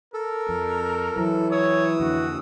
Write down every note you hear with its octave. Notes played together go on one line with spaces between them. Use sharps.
A4 A#4
F2
E3 F#3
C#5 D#6 E6
F2 D3 F#4